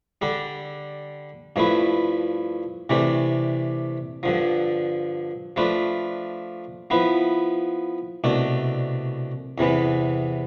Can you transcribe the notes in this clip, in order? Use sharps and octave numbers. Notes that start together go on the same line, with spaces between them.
D3 G3 D4 A4
G2 F3 A3 E4 B4
C3 E3 A3 D4 G4
G2 D3 F3
F3 A3 D4 F4 B4
F3 B3 E4 B4
C2 B2 A3 D4 A4
E2 C3 E3 B3